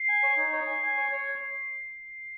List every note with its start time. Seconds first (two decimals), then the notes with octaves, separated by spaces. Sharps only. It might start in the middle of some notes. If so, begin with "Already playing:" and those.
Already playing: C7
0.09 G#5
0.23 C#5
0.37 D#4
0.53 C#5
0.67 G#5
0.83 G#5
0.97 C#5
1.12 C#5